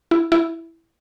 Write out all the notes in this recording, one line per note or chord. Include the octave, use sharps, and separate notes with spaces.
E4
E4